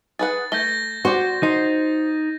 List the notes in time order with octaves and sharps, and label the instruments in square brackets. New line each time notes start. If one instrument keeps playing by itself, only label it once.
[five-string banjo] G#4 B4 F#5 [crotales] A6
[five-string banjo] A3 [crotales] G6 A#6 G7
[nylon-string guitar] F#4 [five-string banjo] C5 D5
[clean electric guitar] D#4 [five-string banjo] C5